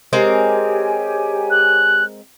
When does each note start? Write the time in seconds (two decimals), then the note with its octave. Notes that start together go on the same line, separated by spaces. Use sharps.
0.13 G#3 C4 G4 A#4 C#5 G#5
1.50 F#6